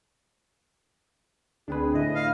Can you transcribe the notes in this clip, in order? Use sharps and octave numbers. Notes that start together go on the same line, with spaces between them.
D2 C4 D4 G#4 B4
A2 D3 E4 D#5
F5